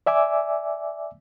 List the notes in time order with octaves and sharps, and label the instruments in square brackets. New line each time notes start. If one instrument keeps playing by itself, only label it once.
[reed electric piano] D5 E5 G#5 D6 E6